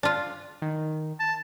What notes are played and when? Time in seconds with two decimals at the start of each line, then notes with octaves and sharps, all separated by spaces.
0.03 D4 F4
0.62 D#3
1.19 A5